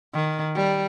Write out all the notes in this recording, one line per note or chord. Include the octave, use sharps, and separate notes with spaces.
D#3
G3